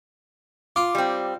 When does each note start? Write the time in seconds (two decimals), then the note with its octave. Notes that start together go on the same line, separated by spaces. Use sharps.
0.76 F4 D6
0.95 G3 C4